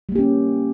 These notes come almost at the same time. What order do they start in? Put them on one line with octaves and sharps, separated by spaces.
G3 A#3 G4 C#4